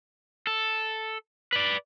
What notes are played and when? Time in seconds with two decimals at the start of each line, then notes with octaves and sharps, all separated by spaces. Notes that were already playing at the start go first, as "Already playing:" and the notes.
0.47 A4
1.53 B4 D5